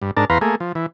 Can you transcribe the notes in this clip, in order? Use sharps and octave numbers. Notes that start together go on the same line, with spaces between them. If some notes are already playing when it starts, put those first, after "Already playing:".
G2
G#2 D4 A#4 A5
E2 B4 F5 A#5 C6
A3 A#3 G#4
F3
E3